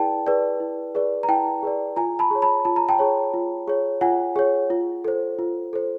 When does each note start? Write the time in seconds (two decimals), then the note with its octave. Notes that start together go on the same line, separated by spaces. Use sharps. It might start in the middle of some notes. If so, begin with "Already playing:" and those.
Already playing: E4 G#4 B4 D5 G5 A5
0.27 G#4 B4 D5
0.60 E4
0.95 G#4 B4 D5
1.23 A#5
1.28 E4 G5 A5
1.63 G#4 B4 D5
1.96 F4 G#5 A#5
2.19 A5 B5
2.31 G#4 C#5
2.42 A5 B5
2.65 F4 A5
2.76 A#5
2.89 G5 A5
2.99 G#4 C#5
3.34 F4
3.68 G#4 C#5
4.01 F4 F#5 G#5
4.36 G#4 C#5
4.70 F4
5.05 A4 C5
5.39 F4
5.73 A4 C5